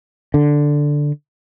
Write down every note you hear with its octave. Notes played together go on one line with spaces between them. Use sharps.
D3